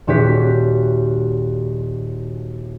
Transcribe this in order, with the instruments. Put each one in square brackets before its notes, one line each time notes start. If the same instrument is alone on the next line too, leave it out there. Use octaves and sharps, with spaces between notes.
[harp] D#1 F#4 G4 C#5 B6